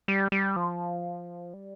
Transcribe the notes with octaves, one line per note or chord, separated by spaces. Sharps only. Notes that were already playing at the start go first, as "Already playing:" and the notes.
G3
G3
F3
G3